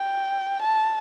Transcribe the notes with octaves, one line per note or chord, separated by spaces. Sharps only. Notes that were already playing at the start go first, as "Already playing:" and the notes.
Already playing: G5
A5